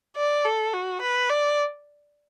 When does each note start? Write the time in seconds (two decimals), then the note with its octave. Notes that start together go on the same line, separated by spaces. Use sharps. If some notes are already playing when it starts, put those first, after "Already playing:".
0.17 D5
0.45 A4
0.73 F#4
1.01 B4
1.30 D5